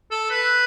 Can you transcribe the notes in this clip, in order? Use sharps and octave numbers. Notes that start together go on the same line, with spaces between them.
A4
B4